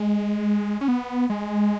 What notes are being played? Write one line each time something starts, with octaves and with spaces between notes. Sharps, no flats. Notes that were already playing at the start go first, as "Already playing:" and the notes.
Already playing: G#3
C#4
B3
G#3